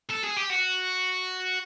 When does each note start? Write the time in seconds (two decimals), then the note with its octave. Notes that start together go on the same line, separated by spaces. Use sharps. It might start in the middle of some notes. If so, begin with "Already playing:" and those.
0.10 A4
0.24 G#4
0.37 G4
0.50 F#4